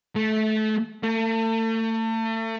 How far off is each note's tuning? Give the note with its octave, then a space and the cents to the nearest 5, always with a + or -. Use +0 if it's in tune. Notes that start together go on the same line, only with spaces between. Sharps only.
A3 -25
A3 +35